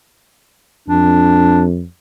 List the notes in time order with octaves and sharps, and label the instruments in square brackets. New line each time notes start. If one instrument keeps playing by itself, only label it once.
[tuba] F2 [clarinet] D4